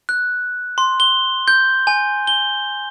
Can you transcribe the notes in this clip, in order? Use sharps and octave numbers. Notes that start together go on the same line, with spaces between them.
F#6
C6
G7
G6
G#5
G7